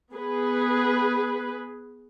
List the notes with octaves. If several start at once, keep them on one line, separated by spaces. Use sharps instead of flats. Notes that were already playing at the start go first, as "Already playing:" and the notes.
B3 G#4 B4